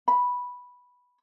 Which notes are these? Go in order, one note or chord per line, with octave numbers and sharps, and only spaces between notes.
B5